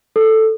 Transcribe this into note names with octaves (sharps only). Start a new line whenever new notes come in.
A4